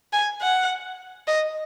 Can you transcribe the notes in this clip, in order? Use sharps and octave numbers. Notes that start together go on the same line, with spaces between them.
G#5
F#5
D#5